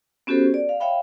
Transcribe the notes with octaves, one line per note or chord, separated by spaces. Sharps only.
B3 C#4 F#4 G4 A4 C5
G#4
D5
F5
C#5 E5 F5 G5 B5